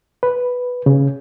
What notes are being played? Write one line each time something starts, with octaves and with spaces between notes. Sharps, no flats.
B4
C#3